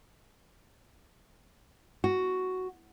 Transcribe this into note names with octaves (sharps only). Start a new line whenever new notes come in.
F#4